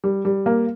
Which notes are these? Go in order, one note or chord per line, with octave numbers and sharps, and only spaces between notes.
G3
G3
A#3